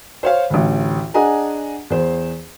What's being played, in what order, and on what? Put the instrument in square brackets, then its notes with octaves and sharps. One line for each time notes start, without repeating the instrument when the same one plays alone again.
[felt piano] C5 C#5 F5
A1 D2
D4 G#4 D#5 F#5 G#5 A#5
E2 C5